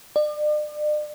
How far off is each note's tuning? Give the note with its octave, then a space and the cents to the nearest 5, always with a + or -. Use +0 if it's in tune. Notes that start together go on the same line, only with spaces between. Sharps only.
D5 +40